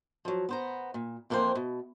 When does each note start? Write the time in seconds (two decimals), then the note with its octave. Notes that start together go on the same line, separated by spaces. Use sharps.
0.25 F3 F#3
0.49 B3 C5 A#5
0.94 A#2
1.30 F2 E3 A#3 A4 C5 G5
1.55 B2